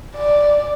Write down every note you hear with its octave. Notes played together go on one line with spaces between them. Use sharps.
D5